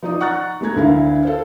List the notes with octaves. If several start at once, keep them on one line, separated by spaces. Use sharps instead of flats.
F3 D#4 D5 D#6
F#5 A#5 C#6 F6 F#6 A6
G#3 A3 A#5 G#6
D2 D3 E4 A#4 F5
A4 C5 F5